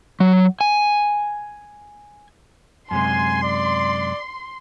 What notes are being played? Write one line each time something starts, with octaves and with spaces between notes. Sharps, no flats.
F#3
G#5
F#2 C3 G#3 G#5 C6
D5